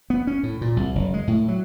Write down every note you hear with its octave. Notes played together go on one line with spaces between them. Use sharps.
B3
C#4
A2
A#2
C2
F#1
G#3
A2
F#3